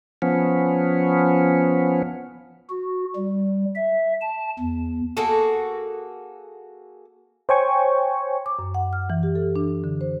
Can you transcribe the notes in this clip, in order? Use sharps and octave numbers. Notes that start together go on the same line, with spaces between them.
F3 B3 C#4
F#4
G3
E5
A5
E2
A#3 F#4 G#4 A4
C5 C#5 G5 G#5 C#6
D6
F#2
F#5
F6
E3
G4
A4
D4
D3
C5